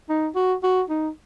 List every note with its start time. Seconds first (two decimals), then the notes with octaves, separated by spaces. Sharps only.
0.09 D#4
0.35 F#4
0.63 F#4
0.89 D#4